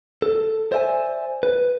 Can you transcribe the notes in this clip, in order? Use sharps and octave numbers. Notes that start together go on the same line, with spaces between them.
A4
C5 D5 E5 G5 G#5
B4